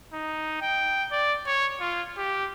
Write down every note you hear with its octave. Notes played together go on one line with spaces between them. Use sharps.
D#4
G5
D5
C#5
F4
G4